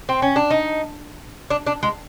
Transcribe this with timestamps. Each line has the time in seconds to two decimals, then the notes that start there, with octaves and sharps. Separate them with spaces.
0.09 C4
0.22 C#4
0.36 D4
0.51 D#4
1.50 D4
1.67 D4
1.83 G#3